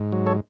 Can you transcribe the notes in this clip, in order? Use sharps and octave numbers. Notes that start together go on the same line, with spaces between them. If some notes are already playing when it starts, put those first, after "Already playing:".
Already playing: G#2
F#3
A4 C#5